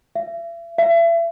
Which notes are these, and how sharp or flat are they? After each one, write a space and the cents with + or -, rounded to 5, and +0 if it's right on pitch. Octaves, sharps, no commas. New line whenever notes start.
E5 +40
E5 +35